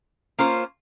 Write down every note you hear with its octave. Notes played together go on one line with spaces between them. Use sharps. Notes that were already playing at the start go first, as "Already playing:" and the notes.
A#3 C#4 F4 C5